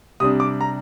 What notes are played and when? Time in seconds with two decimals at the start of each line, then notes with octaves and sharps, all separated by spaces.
0.20 C3 G3 D4 D#6
0.40 D6
0.61 A#5